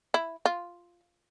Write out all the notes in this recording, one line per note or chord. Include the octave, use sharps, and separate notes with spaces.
E4
F4